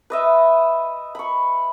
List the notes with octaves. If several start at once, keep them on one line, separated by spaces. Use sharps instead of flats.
B4 D#5 E5
B5 C#6